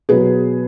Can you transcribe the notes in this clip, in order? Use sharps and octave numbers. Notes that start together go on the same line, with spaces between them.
B2 F#3 G#4 B4